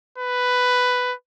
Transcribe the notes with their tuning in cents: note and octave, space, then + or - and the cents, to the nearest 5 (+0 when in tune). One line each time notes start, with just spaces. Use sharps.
B4 +10